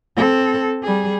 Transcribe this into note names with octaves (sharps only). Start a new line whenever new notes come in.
C4 A4
G3 G#4